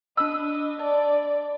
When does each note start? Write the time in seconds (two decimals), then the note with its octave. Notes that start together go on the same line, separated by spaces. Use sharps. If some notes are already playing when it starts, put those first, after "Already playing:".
0.17 D4 D#5 B5 E6
0.79 D5 A5